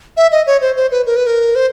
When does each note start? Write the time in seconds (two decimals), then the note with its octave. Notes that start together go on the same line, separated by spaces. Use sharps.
0.17 E5
0.32 D#5
0.47 C#5
0.61 C5
0.76 C5
0.91 B4
1.06 A#4
1.16 B4
1.27 A#4
1.55 C5